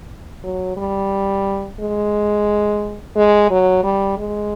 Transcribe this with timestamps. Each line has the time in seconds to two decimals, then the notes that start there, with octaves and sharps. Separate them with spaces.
0.44 F#3
0.77 G3
1.80 G#3
3.16 G#3
3.50 F#3
3.83 G3
4.18 G#3